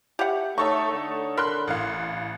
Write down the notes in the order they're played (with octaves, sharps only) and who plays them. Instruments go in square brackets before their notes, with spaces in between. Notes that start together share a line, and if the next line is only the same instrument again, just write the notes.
[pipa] G4 E5 F#5
[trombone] A3 [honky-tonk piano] D#4 A4 C#5 [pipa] C#6
[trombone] D3
[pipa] A#4 [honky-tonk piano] B5 C6 F#6
[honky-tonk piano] A1 F5